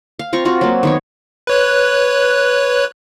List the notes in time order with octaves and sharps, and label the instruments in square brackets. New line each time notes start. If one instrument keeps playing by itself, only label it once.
[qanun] F5
C4 F4 A#5 C#6
C4 F4 F#4
F#3 A#3
D#3 B3 C#5
[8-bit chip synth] B4 C#5 F#6